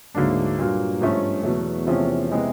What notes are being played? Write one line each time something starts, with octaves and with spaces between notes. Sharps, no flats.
D2 G#2 D3 F#3 A#3 D4
G2 A#2 F#3 A#3
G#2 F3 A3 C#4
E2 B2 F#3 A3
C3 F3 A3 C#4
C3 E3 G#3 B3